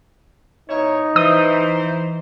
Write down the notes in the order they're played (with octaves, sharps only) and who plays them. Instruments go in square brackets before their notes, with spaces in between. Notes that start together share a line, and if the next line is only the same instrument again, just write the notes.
[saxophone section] B2 E4 C#5 [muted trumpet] D#4
[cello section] E3 [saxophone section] C5 [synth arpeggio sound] D#6